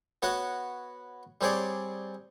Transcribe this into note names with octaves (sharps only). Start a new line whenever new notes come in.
B3 F#4 C#5 F#5
G3 C4 G#4 C#5 D5